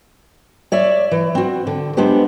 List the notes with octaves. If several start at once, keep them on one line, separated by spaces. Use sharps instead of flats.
C#5 D5 E5
E3
C4 F#4
D3
G#3 B3 D4 G4 C5